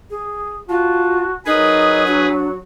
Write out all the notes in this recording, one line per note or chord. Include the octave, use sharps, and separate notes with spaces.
G#4
F4 F#4 A5
F#3 D#4 G#4 A#4 B4
D4 F#4